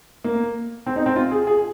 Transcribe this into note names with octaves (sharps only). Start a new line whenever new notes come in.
A#3
C4
D#4
C4
F4
G#4
G#4